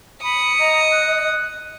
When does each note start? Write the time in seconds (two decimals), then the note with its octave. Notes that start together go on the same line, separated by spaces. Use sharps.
0.23 B5 D#6 C#7
0.60 D#5 A#5
0.92 F#6